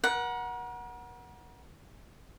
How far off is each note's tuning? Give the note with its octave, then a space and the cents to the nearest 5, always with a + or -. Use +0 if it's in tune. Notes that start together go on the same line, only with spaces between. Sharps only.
A#4 +40 F#5 +0